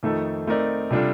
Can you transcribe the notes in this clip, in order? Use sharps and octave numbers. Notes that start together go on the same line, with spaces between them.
F2 D#3 A3 D#4 A4
A3 C4 D#4 A#4 D5
C3 G3 D4 F4 A4